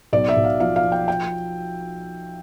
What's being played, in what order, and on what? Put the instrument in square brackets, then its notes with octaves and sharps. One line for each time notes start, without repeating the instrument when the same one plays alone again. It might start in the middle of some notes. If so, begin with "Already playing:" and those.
[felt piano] B1 D5
E5
B1
F5
F3 F5
F5
F3
G5
G5